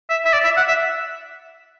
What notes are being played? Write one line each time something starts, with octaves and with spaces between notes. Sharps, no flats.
E5
E5
D5
E5
F#5
E5